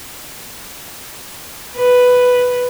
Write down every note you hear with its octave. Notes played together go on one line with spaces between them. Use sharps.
B4